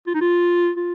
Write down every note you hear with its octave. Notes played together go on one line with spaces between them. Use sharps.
F4
D#4
F4
F4